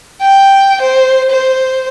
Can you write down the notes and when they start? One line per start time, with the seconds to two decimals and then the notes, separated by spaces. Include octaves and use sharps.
0.21 G5
0.81 C5
1.30 C5